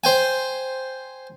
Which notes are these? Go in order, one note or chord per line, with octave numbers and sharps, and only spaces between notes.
C5 G5 G#5